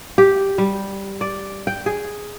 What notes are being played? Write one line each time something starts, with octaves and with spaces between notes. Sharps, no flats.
G4
G3
D5
G5
G#4